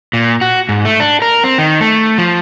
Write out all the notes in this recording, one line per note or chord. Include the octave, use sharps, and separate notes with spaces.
A#2
F#4
G#2
A3
D4
A#4
C4
D#3
A3
F3